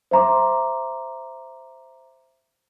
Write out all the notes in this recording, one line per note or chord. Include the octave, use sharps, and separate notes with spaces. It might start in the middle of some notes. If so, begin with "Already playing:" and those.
C5 E5 A#5 C6 D6